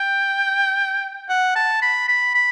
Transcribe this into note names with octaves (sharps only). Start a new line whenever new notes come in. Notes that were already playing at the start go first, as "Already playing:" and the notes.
Already playing: G5
F#5
A5
B5
B5
B5